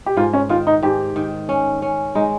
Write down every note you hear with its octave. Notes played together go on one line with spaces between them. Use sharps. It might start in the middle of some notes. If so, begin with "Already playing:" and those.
G4
G#2 F4
C#4
D#3 F4
D#4
G#2 G4
D#3
C#4
C#4
G#3 D#4